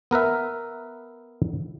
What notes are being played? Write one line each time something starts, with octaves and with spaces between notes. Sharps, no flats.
B3 A#4 B4 E5